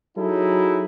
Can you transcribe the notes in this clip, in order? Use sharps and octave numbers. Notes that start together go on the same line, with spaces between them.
F#3 D#4 E4 G#4 A4